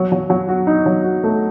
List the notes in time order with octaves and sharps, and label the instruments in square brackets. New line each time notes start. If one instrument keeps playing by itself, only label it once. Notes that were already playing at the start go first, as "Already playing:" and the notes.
Already playing: [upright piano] F#3
F#3
F#3
F#4
D#4
F#3
F#4
A3